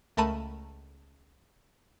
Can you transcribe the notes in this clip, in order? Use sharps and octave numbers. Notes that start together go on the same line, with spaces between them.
C#2 A3 A#4 A5 B5 D#7